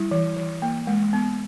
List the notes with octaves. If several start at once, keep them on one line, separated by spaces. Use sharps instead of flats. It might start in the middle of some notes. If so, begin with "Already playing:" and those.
Already playing: G3 E4
E3
E3
A#3
G#3
B3